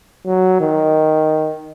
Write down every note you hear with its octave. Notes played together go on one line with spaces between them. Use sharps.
F#3
D#3